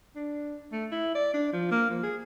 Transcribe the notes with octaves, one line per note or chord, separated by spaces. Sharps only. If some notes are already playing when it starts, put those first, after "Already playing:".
D4
A3
E4
D5
D4
F3
A#3
F3
G#4